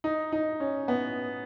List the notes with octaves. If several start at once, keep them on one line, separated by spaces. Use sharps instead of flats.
D#4
D#4
C#4
B3